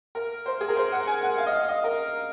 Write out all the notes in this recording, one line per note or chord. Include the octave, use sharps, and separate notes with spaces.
A#4
C5
G#4
A#4
C5
F#5
G#5
F#5
F5
D#5
F5
D#5
A#4